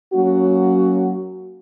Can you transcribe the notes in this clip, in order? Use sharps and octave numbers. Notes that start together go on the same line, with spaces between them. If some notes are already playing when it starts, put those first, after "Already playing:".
F#3 A#3 C#4 F#4